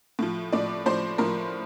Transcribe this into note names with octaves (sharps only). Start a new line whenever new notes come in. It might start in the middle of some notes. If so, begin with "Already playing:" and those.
A2 F3
A2 F3 D5
A2 F3 C5
A2 F3 A#4